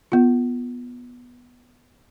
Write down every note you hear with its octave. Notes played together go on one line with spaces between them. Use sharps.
B3 F4